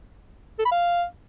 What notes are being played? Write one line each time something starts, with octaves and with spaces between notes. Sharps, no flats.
A4
B5
F5